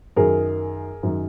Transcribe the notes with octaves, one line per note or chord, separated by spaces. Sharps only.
F#2 D#3 G#4 A#4
F#2 D#3